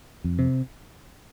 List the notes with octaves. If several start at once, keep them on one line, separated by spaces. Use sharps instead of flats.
F2
C3